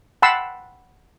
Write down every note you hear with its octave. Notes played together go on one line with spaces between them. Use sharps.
F#5 G5 A5 B5 C6 E6